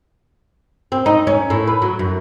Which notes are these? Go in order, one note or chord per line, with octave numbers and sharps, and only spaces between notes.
C4
D#4
C#4
A2
B4
F#3
F#2